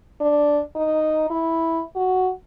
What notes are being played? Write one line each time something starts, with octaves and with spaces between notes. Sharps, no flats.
D4
D#4
E4
F#4